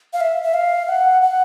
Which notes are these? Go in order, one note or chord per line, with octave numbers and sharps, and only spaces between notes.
F5
E5
E5
F5
F#5
F#5